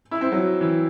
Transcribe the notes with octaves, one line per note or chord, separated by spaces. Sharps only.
E4
C4
F#3
E3